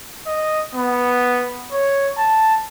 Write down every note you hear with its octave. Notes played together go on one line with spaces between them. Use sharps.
D#5
B3
C#5
A5